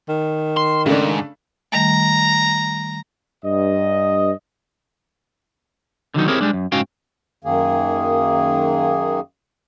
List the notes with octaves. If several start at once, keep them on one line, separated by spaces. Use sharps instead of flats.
D#3
C6
G#2 C#3 A3 D4
D#3 G3 A3 A#5
G2 D#5
D3 D#3 F#3 D#4
C4 E4 G4 G#4 A#4 C#5
G3 G#3 D4
F#2
G#2 C#4 F#4 F5 G5
F#2 D#3 A#3 G#4